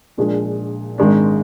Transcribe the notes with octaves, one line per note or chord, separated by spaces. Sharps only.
A#1 A#2 G#3 D4 G#4
G#1 G#2 D#3 G#3 D4